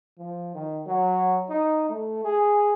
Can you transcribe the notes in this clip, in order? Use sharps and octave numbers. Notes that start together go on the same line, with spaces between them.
F3
D#3
F#3
D#4
A3
G#4